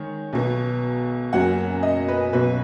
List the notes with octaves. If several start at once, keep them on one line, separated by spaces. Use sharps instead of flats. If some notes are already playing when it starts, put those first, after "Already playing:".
Already playing: D#3 G#3 C#5
B1 B2 B3
F#1 F#2 F#3 C#4 F#5
D#5
B4
B1 B2 F#3 B4